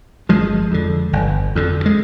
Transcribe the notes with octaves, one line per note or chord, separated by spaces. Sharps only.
G1 F3 G#3
F2 D3
G1
F2 D3
G#3